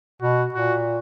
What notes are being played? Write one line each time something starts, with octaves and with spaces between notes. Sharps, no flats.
B2 F#4
A#2 F#4